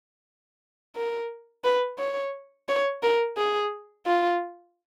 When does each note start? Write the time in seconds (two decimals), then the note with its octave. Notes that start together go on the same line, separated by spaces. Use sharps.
0.96 A#4
1.64 B4
1.99 C#5
2.69 C#5
3.03 A#4
3.37 G#4
4.06 F4